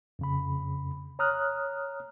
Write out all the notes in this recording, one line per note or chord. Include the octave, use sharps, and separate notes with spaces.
F2 C#3 B5
C#5 A#5 D#6 F6 F#6